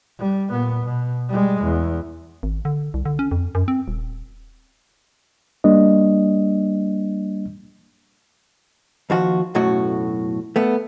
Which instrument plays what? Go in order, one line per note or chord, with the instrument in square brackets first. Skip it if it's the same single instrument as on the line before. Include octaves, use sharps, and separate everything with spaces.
[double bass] G3
A#2 B3
B2
G3 G#3
E2
[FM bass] G#1
D3
C2
D3
C#4
F2
F#2
C4
D#1
[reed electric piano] G3 A#3 D4 D#5
[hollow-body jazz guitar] D#2 F3 F#4
B1 F#2 A2 A3 F#4
A3 B3